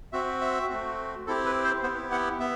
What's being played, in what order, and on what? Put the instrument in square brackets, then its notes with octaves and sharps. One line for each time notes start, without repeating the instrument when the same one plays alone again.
[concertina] C4 F#4 E5
E5
A3 C4 F#4
C4 E4 G4 A4
B4
C5
B3 E4 G4 C5
F#5
B3 E5